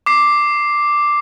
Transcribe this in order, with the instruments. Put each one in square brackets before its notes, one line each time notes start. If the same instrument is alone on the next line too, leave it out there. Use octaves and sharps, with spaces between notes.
[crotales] D6 C7